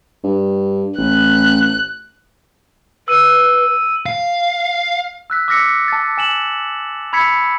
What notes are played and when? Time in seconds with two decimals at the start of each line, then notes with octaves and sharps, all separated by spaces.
0.24 G2
0.98 A1 F#6
3.08 B4 E6 D#7
4.06 F5
5.30 E6 F#6 B6
5.48 D6 E6 F6 A#6 B6 C#7
5.88 A5 A6
6.18 G#5 E7 F#7
7.13 B5 E6 G#6 B6 C#7